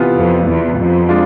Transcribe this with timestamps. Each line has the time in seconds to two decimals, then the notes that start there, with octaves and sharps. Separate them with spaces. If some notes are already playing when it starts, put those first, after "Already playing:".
Already playing: C3 E3 B3 F4
0.17 F2
0.48 E2
0.78 F2
1.09 G#3 D4 F4